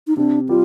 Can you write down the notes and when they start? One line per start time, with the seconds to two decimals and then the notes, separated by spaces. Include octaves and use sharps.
0.07 D#4
0.17 C3 D4
0.49 G3 F4